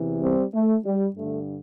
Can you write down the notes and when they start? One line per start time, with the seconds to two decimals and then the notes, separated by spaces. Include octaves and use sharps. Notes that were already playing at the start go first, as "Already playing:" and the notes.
Already playing: E2 C3 E3
0.22 G3 C4
0.54 A3
0.85 G3
1.16 G2 D3 A3